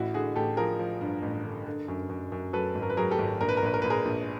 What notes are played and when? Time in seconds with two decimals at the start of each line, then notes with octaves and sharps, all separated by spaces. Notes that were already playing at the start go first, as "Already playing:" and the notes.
Already playing: A1 E4 F#4
0.14 D3 F#4 G#4
0.36 A1 G4 A4
0.57 F3 G#4 A#4
0.79 F3
1.01 G2
1.22 A1
1.44 D3
1.66 D3
1.88 F#2
2.09 F#2
2.32 F#2
2.53 F#3 A4 B4
2.75 G#1
2.82 A#4
2.90 B4
2.97 F#3 G#4 A#4
3.11 G4 A4
3.19 G#1
3.41 A#1 A#4
3.49 B4
3.57 A#4
3.62 A#1 B4
3.74 A#4
3.82 A#1 B4
3.90 G#4 A#4
4.05 A#1